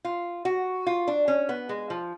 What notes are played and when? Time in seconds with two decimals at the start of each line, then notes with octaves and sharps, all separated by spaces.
0.05 F4
0.45 F#4
0.87 F4
1.08 D4
1.28 C#4
1.49 B3
1.69 G#3
1.90 F3